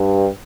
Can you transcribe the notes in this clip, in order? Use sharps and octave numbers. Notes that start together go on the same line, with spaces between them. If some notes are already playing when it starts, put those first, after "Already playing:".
Already playing: G2